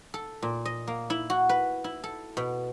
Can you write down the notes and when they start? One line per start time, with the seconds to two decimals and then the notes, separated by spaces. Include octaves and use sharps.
0.14 A4
0.42 A#2
0.65 D#5
0.87 A#3
1.10 E4
1.30 F#4
1.49 B4
1.84 E4
2.04 A4
2.37 B2